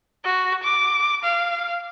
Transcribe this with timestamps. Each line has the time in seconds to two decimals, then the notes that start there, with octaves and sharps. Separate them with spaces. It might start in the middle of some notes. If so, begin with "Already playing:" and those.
0.24 F#4
0.63 D6
1.23 F5